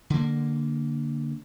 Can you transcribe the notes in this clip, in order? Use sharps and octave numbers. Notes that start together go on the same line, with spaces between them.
D3 A#3